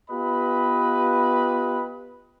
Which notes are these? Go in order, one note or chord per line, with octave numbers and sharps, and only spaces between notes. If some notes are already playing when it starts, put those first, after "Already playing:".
B3 F4 G4 B4 D#5 B5